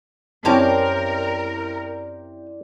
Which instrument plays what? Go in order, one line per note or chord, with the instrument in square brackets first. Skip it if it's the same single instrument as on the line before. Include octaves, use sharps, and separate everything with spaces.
[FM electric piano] F#2 E4 D5 [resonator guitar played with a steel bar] C4 G4 [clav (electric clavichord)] C#4 A5 [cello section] A#4